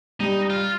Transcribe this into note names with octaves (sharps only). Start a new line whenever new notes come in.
G3 D#4
F4